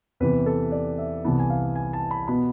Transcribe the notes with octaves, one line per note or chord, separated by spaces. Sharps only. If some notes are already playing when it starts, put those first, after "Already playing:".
E2 C3 E3 B4
A4
D5
E5
C2 C3 E3 B3 A5
G#5
F5
G#5
A5
B5
B2 B3 B5